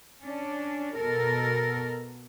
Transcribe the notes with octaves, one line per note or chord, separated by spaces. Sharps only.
C#4 D4
B2 A4 A#4